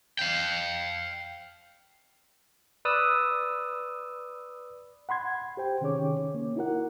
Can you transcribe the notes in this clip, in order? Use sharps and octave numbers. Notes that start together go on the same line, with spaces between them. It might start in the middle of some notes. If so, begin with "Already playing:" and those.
F5 G5
B4 D5 D#6 E6
F#5 B5 C6 G#6
G4 C5 G5
C3 D#3 C#4 G#4 C#5 D6
A#3
D#4 E4 F#4 A#4 F#5